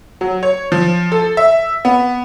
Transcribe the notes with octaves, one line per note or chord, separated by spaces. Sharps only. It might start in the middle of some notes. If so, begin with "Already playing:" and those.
F#3
C#5
F3
A4
E5
B3